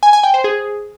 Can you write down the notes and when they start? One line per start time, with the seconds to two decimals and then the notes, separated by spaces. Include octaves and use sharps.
0.03 G#5
0.13 G#5
0.23 G5
0.34 C5
0.44 G#4